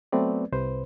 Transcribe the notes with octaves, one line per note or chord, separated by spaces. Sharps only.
F#3 A3 B3 C4 B4 D5
C2 C3 B4 C5